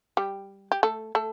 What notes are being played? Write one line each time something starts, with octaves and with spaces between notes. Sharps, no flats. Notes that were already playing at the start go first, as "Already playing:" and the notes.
G3 G4
G4
A3 A4
A3 A4